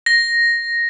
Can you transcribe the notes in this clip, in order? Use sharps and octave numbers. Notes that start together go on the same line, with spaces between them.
A#6